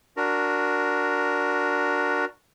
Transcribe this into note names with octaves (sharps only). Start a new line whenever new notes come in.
D4 F#4 A#4